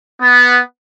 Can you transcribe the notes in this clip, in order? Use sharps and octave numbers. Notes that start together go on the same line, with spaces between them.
B3